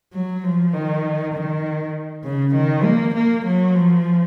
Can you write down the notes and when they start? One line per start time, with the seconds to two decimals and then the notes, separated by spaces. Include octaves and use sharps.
0.13 F#3
0.44 F3
0.73 D#3
1.35 D#3
2.25 C#3
2.55 D#3
2.84 A#3
3.14 A#3
3.45 F#3
3.75 F3